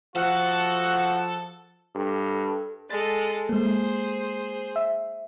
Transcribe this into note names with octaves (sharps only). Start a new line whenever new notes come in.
F3 F#4 A4 F#5
G2 A4
G#3 A4 A6
G#3 A#3 G#4 C5
E5